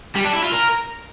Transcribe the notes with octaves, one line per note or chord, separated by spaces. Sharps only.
G3
D4
E4
F4
A#4